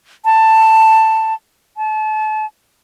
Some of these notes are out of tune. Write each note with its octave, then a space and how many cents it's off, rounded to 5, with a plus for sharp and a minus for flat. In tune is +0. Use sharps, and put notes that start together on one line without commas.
A5 +10
A5 -35